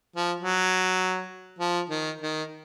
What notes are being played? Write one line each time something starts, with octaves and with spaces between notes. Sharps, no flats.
F3
F#3
F3
D#3
D#3